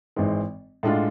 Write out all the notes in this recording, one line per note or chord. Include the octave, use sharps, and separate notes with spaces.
G#1 G#2 E3 G#3 C4
A2 G#3 D4 F4